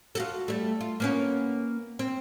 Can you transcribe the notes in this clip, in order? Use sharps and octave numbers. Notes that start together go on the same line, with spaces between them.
F4 F#4 A4
G3 A3
F4
A#3 B3 C#4
C4